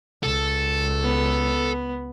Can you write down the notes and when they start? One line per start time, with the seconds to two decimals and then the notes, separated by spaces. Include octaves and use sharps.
0.23 C#2 A4
1.04 B3